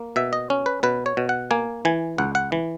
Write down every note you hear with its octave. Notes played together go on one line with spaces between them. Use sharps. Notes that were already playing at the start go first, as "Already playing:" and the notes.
Already playing: A#3
B2 E5
D#5
C#4
B4
B2 B4
C#5
B2
F#5
A#3 G#5
E3 G#5
C#2 F#5
F#5
E3